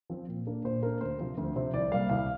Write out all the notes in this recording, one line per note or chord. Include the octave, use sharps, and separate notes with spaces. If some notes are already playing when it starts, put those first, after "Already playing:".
F3 C4
A#2
A#3 D4
A#2 C5
A#3 D4 A#4
D2 C5
C3 F3 C4
D2
C3 F3 C4
C2 D5
C3 G3 A#3 F5
C2 F5